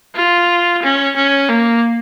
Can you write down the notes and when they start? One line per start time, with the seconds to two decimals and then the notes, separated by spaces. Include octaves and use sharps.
0.15 F4
0.83 C#4
1.16 C#4
1.49 A#3